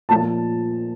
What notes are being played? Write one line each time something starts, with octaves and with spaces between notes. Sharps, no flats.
A#2 F3 A#3 A5